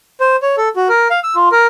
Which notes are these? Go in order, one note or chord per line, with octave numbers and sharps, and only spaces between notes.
C5
C#5
A4
F#4
A#4
F5
E6
F4
A#4